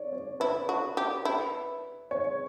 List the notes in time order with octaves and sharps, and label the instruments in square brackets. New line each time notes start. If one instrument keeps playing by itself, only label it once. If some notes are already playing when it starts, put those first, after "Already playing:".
Already playing: [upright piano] C#5 D5
C#5
[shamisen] E4 [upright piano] B4
[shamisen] F#4
G4
E4
[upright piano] C#5